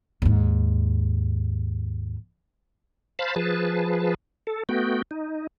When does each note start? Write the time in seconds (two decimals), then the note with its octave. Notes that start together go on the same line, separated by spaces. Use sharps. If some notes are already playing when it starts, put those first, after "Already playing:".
0.22 D#2 G#2
3.19 C5 F5 A5 B5
3.36 F3 G#4 B4 A5
4.47 A4
4.69 A3 B3 F#4 G5
5.11 D#4